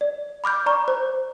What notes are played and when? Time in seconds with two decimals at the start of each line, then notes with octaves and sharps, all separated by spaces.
0.01 D5
0.44 B5 D6 F6 G6
0.66 D5 A#5 C#6
0.88 C5